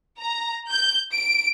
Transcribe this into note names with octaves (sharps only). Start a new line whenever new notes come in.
A#5
G6
D7